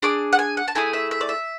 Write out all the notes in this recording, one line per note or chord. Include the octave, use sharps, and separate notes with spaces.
D4 G#4 D6
F#5
G#5
F#5
A5
A3 E4 G#4 G#5
E5
E5
D5
E5